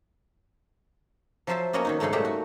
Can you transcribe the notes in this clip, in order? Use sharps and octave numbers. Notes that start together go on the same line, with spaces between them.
F3 F#3 F4 C5 E5 A5
A#3 B3 C#4 F#4 D#5 A#5
D#3 C#4 D#4
G#2 C#3 G#3 A3 D#4
A#2 F#3 G3 A3 G4 A#5
F#4